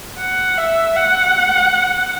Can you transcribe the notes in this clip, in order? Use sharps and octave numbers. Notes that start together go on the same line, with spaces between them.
F#5
E5
F#5